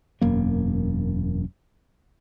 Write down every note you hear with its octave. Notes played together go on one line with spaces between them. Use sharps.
E1 F#2 A#3